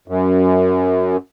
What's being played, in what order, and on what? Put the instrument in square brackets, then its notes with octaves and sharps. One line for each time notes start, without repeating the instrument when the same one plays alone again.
[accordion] F#2